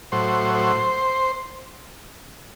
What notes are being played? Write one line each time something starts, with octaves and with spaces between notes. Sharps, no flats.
A2 F#3 C5
C5